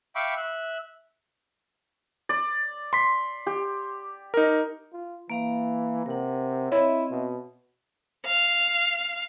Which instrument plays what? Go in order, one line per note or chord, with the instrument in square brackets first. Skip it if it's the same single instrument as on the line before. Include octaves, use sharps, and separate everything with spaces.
[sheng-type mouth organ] E5 F5 G5 B5 C#6 D6
E5 F#6
[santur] D5
[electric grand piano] C6 B6
[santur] G4
[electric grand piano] D#4 A#4
[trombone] F4
[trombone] E3 [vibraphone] A#3 F5 A#5
[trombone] C3 [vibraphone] A#4 F#5
[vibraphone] C4 D#5 E5 [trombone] E4 [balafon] C#5
[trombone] B2
[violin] F5